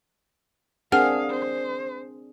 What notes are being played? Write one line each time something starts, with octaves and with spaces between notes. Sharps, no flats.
C4 D4 G#4 A#4 F5 F#5 F6 F7
C5